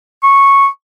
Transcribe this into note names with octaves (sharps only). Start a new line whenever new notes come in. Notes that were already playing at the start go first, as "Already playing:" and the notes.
C#6